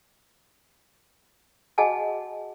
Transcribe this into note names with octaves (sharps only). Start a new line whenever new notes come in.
F#4 G#4 D#5 F#5 G#5 A5